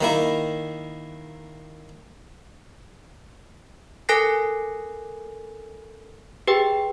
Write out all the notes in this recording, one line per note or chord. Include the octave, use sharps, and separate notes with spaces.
D#3 A#3 E4
A4 A#4 G#5 F#6 A#6 C7
G4 G#4 B4 G5